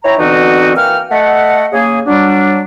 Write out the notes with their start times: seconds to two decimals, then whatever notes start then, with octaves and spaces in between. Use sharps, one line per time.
0.04 E4 C#5 G5 A#5
0.18 B2 D3 E3 C4 D#4 F#4
0.76 E3 A#3 G5 F6
1.10 A3 D#5 F#5
1.72 C#3 A#3 G#4
2.07 F#3 G3 D4